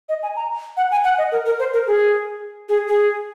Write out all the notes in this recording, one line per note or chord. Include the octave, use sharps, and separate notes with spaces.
D#5
G#5
A#5
F#5
G#5
F#5
D#5
A#4
A#4
C5
A#4
G#4
G#4
G#4